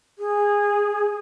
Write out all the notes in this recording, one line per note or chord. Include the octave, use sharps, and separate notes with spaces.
G#4